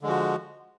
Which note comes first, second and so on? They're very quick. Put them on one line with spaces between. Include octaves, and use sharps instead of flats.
D3 G#3 F3 F#4